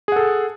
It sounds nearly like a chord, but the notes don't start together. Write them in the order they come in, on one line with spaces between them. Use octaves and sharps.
G#4 F#5 A4